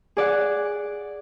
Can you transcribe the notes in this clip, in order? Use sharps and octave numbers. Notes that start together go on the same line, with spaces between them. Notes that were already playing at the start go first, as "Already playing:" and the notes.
G#4 D5 F#5